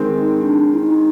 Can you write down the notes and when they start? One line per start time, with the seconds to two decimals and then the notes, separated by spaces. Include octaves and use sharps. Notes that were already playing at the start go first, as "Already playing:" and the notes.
Already playing: D#3 G#3 C4
0.17 D#4
0.42 D4
0.74 E4
0.79 D#4